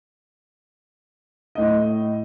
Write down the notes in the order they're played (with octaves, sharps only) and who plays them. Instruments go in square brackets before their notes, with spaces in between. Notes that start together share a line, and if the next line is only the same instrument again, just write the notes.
[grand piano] A2 D#5